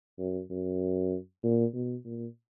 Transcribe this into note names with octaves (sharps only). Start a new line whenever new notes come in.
F#2
F#2
A#2
B2
A#2